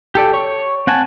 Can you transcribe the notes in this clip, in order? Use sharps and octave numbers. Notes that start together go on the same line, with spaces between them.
G4 A4 D5
C#5 C#6
C4 F#5 G#5 A5